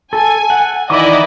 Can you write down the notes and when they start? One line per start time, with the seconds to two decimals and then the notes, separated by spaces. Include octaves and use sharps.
0.13 A4 G#5
0.50 F#5
0.90 D#3 E3 E4 D5 D#5 D6